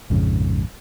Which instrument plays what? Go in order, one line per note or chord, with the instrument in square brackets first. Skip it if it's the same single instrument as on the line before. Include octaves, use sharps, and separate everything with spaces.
[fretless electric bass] A#1 F2 G#2 C#3